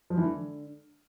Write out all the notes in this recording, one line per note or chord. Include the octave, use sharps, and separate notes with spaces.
F3
E3
D3